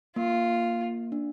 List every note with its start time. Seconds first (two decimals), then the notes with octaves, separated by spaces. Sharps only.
0.16 A#3 F4
1.12 D4